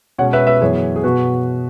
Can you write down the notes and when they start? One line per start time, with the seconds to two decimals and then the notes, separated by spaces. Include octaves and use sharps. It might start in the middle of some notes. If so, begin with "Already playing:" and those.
0.18 B2 G#3 C#4 C#5 F#5
0.33 B4 E5
0.47 B4 E5
0.61 F#2 E3 B3 G#4 C#5
0.96 G#4
1.03 B2 B3 F#4 B4